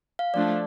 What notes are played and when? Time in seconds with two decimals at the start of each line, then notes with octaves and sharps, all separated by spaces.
0.19 F5
0.34 F3 A3 D4 D5